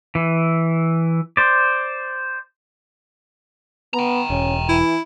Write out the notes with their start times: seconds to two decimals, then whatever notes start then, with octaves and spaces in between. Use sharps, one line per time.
0.15 E3
1.37 C5 D5
3.94 B3 G5 A#5
4.30 E1 C#4
4.69 E3 E4